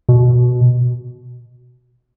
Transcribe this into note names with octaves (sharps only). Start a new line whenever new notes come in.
B2